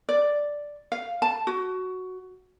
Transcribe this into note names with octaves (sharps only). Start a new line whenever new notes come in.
D5
F5
A5
F#4